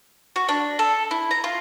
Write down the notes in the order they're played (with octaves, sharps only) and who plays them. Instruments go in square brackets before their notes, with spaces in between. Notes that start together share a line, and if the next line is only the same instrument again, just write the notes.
[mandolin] F#4
D4
A4
E4
A#5
F4